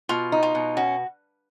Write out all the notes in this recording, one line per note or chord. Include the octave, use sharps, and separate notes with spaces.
B2 F4
D#4
F4
B2
C#4 F#4